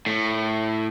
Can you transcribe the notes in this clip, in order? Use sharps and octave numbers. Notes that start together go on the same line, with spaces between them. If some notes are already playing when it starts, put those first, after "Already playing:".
A2